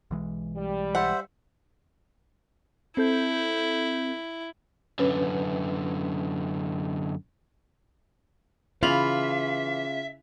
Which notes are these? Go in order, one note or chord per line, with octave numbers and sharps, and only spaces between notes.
B1 E3 G#3
G3
C5 E5 F#5
C4 E4 A4 G6
F#2 D3 C#4 B4
C#3 E3 F4 E5 F7 F#7